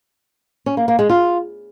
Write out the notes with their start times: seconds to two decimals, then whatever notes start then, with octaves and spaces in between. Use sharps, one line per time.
0.66 C#4
0.77 A#3
0.88 A#3
0.99 G#3
1.09 F4